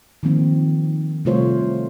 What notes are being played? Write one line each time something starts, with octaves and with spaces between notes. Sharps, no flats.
D#3 F3 A#3 C4
C3 G3 A3 F4 C5 C#5